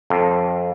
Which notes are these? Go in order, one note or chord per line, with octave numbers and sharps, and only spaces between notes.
F2